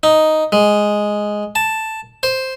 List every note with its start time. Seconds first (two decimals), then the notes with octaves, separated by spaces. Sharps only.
0.03 D#4
0.52 G#3
1.55 A5
2.23 C5